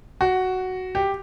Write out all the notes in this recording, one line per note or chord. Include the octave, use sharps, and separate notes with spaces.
F#4
G4